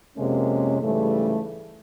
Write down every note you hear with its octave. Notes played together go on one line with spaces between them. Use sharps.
F2 C3 G#3 A#3 C#4
G#2 C#3 E3 G3 A3